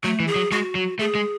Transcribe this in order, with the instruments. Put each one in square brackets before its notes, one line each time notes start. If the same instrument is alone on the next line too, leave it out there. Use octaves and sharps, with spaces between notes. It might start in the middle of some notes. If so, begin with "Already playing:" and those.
[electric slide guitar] F#3 [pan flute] A3
[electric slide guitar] E3
[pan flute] G#4
[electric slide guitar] F#3
[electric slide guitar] G#3 [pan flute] F#4
[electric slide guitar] F#3
[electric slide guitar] A3 [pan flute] G#4
[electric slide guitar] G#3